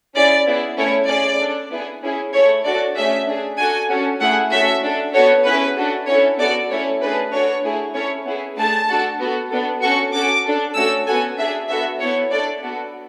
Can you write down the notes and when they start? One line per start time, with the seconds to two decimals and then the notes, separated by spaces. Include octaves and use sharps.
0.15 C#4 E4 G#4 D5
0.46 B3 E4 G#4
0.77 A3 C#4 E4 A4 C#5
1.09 C#4 G#4 D5
1.40 D4 A4
1.71 B3 E4 G#4
2.02 C#4 E4 G#4
2.33 A3 E4 A4 C#5
2.65 D4 F#4 A4 D5
2.96 A3 C#4 G#4 E5
3.27 D4 G#4
3.58 D4 F#4 A4 G#5
3.90 C#4 F#4 A4
4.21 A3 E4 G#4 F#5
4.52 A3 C#4 F#4 A4 E5
4.83 D4 A4
5.14 B3 F#4 A4 C#5
5.45 C#4 E4 G#4 B4
5.77 D4 F#4 A4
6.08 C#4 E4 A4 C#5
6.39 B3 F#4 A4 D5
6.70 A3 C#4 E4 A4 C#5
7.01 A3 D4 G#4 B4
7.33 D4 F#4 A4 C#5
7.64 A3 E4 G#4
7.95 C#4 E4 A4 C#5
8.26 B3 E4 G#4
8.57 A3 D4 G#4 A5
8.89 D4 F#4 A4
9.20 B3 F#4 A4
9.51 B3 D4 A4
9.82 C#4 F#4 A4 C#6
10.13 C#4 F#4 A4 D6
10.45 D4 A4
10.76 A3 C#4 F#4 A4 E6
11.07 B3 F#4 A4 G#5
11.38 D4 G#4 E5
11.70 B3 F#4 A4 E5
12.00 B3 E4 A4 C#5
12.32 D4 A4 D5
12.63 B3 F#4 A4